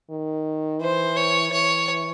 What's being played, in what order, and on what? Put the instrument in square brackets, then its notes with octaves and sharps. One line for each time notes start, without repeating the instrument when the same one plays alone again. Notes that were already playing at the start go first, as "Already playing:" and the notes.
[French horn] D#3
[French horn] E3 [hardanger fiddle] C5
[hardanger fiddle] C#5
[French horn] E3 [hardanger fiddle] C#5